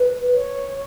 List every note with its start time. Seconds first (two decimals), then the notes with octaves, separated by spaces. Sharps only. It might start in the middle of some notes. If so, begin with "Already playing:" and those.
Already playing: B4
0.32 C#5